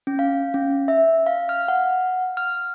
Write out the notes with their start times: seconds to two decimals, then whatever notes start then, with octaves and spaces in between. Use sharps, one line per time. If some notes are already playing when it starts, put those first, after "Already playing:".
0.07 C#4
0.19 F5
0.54 C#4
0.88 E5
1.26 F5
1.49 F6
1.68 F#5
2.37 F6